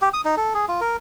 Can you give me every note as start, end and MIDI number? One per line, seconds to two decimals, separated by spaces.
0.02 0.09 67
0.13 0.21 87
0.25 0.35 63
0.37 0.53 69
0.54 0.66 68
0.68 0.80 65
0.81 0.97 70